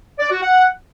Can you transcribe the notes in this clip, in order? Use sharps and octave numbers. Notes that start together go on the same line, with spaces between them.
D5
F#4
F#5